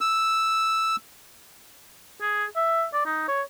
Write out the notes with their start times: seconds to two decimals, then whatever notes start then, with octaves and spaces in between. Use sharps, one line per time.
0.01 E6
2.21 G#4
2.56 E5
2.93 D5
3.06 D#4
3.28 C#5